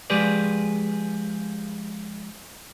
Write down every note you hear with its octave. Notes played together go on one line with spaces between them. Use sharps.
F3 G#3 G4 G#4 B4 D5